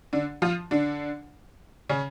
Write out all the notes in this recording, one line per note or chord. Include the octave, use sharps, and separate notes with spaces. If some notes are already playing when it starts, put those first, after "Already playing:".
D3 D4
F3 F4
D3 D4
C#3 C#4